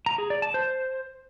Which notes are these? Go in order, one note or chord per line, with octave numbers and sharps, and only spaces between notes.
A#5
G#4
D5
A5
C5